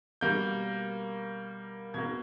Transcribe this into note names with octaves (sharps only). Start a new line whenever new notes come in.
B2 G3 A#3 G6
B2 A#3 G#6